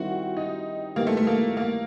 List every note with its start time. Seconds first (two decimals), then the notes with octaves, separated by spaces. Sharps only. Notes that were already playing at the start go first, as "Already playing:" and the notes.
Already playing: D#3 G3 C4 E4 F#4 G4
0.37 D#4
0.96 D#3 G3 A#3 B3 E4 G4
1.07 A3
1.17 A3
1.27 A#3
1.57 A#3